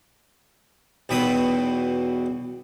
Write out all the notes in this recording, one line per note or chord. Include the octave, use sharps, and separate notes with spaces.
B1 E2 B2 G5 B5 D#6